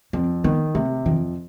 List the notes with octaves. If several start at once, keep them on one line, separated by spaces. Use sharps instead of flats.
F2 C4
D#3 B3
C3 A3
F2 D#3